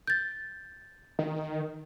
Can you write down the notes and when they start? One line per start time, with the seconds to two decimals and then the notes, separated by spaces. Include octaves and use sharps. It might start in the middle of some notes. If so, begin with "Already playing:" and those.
0.07 G6 A6
1.19 D#3